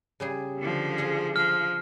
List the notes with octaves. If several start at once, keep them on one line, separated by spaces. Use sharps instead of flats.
C#3 G3 G#4
D3 F3
F4 G#4
F3 F6